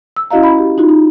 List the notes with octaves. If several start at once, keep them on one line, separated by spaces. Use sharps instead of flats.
E6
C#4 E4 F#4 D#5 F5 A#5
B5
G4
D#4 F4 F#4
D#4